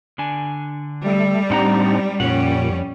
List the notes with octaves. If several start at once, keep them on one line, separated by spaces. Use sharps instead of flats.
D3 D4 G#5
G3 A3
A2 C4 D4 D#4 F#5 A#5
F2 A#2 G3 C#4 G4 F#5